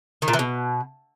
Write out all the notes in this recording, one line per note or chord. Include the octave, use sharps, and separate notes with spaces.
D#3
A#2
E3
B2